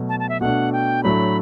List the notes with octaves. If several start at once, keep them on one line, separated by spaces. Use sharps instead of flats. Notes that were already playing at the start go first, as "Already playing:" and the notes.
Already playing: B2 F#3 A3
A5
A5
E5
B2 A3 D4 F#5
G5
A2 F#3 A3 D4 B5